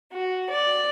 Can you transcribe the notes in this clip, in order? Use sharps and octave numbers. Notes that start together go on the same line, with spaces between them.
F#4
D5